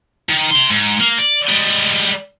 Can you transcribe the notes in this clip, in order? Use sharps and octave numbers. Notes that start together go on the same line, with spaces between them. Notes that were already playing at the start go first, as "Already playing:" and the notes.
D#3
C3 C6
G#2
A#3
D5
G3 G#3